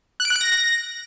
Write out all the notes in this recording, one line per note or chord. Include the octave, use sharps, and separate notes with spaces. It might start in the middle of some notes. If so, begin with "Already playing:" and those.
F#6
D7
F#6
D7
A#6